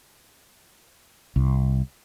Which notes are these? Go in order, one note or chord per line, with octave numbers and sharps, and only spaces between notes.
C2